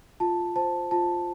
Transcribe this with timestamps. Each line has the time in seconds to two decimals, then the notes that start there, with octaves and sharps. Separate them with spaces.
0.20 F4 A5
0.56 C5 A5
0.91 F4 A5